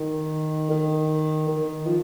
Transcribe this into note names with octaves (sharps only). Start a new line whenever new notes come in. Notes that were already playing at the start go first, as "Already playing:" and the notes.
Already playing: D#3
D#3
D#3
F3